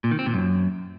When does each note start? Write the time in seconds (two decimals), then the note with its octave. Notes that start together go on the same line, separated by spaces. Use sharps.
0.04 A#2
0.11 D#3
0.19 C4
0.26 A#2
0.34 F#2